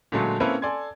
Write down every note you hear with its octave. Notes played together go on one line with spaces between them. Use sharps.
A#2 D3 F#3 G#3 A3
A#3 C4 C#4 E4 A4 B4
A4 D5 G#5 C6 G#6